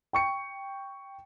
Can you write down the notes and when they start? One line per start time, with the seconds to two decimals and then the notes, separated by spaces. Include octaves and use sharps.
0.13 G5 C#6 C#7